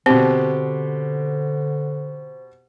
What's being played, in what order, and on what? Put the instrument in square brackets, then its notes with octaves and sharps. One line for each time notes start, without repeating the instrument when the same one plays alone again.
[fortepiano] B2 G4 [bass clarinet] D3 [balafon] C4 [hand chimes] C5